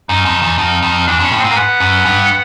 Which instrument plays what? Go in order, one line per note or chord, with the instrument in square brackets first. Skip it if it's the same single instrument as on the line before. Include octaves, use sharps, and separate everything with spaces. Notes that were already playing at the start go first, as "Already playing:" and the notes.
[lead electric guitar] F#2 [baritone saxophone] D#4
[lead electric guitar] F2
E2
[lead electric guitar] F2 [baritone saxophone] D#4
[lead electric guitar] F2
[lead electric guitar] E2 [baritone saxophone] D4
[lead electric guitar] F2 [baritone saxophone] C#4
[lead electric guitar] A2
[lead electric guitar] G#2 [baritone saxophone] C4
[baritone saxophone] A#3
B3
[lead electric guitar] F#2
G2